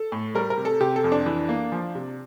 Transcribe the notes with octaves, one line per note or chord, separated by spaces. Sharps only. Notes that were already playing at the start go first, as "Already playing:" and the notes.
Already playing: A4
A2
G3 A#4
A#4
C3
A4
C3 G4
A4
F2
D4
E3
A#3
F3
C3